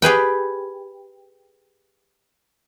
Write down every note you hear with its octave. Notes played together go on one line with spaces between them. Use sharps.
G4 G#4 B4 G5